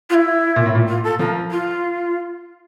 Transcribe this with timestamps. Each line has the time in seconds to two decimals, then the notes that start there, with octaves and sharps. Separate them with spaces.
0.09 F4
0.14 E4
0.56 A#2
0.66 A2
0.75 A#2
0.88 F4
1.04 A4
1.19 F3 A#4
1.51 F4